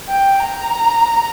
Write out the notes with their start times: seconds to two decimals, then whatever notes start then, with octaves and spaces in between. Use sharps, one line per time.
0.09 G5
0.40 A#5